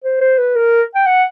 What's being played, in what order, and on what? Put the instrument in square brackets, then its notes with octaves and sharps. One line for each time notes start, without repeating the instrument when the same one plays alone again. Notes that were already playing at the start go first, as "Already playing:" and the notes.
[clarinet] C5
C5
B4
A#4
G5
F#5